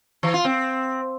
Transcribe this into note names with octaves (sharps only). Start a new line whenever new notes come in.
E3
F4
C4